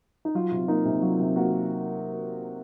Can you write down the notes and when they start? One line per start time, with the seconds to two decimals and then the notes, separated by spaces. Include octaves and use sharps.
0.25 D#4
0.35 F#3 F4
0.51 C3
0.68 A#3 D#4
0.85 C3
1.02 F#3 F4
1.20 C3
1.36 A#3 F#4